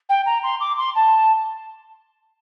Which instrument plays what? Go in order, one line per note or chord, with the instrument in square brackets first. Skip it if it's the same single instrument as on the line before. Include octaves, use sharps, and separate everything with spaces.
[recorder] G5
A#5
C6
D6
C6
A5